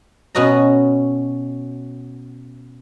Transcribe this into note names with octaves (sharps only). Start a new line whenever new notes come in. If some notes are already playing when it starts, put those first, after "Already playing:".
B2 C#4 F#4 D#5 A#5